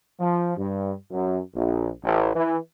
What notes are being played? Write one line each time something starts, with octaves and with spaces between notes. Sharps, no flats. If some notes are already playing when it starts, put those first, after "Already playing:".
F3
G2
F#2
A#1
A1
E3